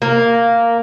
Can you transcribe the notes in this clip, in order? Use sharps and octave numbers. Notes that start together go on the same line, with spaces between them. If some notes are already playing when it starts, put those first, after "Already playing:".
A#3